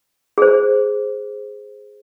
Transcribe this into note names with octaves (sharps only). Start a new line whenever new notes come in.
G#4 C5